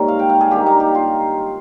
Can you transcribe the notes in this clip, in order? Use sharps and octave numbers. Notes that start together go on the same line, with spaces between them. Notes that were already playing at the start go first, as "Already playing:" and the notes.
Already playing: G#2 D#3 G3 A#3 A#4 C#5
F5
G5
F5
G#4
G2 D#3 A#3 G4
D#4
G4
F4